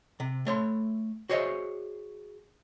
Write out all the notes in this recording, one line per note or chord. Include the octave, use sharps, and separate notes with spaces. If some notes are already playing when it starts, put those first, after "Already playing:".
C3
A3 C#5 C6
F#4 G#4 C5 C#5 D#5 E5